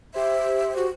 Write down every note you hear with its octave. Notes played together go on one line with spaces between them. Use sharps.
G4 C5 E5
F#4